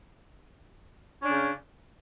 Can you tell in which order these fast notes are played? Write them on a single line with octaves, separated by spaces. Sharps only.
C#4 D4 C#3